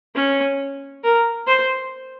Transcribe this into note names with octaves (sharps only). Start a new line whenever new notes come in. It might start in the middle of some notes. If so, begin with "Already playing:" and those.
C#4
A#4
C5